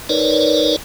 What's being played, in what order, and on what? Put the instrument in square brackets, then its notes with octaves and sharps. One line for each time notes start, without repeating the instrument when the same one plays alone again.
[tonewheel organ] D#4 A#4 B4 C#5 D5